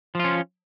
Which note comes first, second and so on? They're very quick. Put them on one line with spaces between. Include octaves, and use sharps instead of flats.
F3 F4 C#4